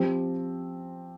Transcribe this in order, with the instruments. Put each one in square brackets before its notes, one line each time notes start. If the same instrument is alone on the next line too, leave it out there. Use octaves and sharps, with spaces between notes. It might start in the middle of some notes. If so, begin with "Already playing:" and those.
Already playing: [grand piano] F3 C4 G4